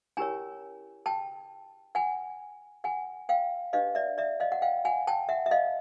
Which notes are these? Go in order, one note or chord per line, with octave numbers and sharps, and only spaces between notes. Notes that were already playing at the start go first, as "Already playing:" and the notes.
C#4 E4 G4 A#4 C#5 G#5 A#5
G5 A5
F#5 G#5
F#5 G#5
F5 G5
D4 G4 B4 D#5 F5
D5 E5
D5 E5
D#5 F5
F#5
F5 G5
F#5 G#5
G5 A5
E5 F#5
E5
D#5 F5